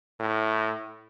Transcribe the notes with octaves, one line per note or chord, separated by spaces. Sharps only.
A2